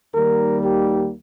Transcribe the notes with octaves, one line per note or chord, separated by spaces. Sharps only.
D#2 D#3 G3 A#3 A#4
G4